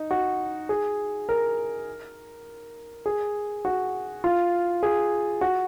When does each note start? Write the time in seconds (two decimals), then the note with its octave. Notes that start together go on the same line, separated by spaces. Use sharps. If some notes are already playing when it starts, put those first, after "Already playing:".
Already playing: D#4
0.11 F#4
0.69 G#4
1.29 A#4
3.06 G#4
3.65 F#4
4.24 F4
4.83 G#4
5.41 F#4